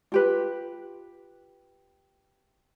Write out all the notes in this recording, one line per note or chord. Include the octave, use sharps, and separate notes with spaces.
F4 G4 B4